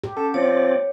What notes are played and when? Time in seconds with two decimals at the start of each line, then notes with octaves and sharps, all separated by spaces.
0.04 G4
0.17 C#4 A4 F#5
0.34 F3 C4 C#5 D5